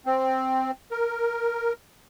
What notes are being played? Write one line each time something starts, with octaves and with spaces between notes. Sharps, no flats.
C4
A#4